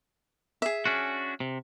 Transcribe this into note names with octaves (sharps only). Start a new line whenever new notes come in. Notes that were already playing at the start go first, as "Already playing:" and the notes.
G#4 E5
C#4 D4 F#4
C3